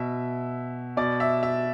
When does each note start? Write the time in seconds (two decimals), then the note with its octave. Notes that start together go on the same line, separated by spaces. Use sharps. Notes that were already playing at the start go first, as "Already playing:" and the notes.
Already playing: B2 E5
0.97 B2 D5
1.20 E5
1.43 E5